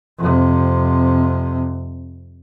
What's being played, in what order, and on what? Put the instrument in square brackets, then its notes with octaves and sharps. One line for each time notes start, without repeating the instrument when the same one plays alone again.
[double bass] F2 C3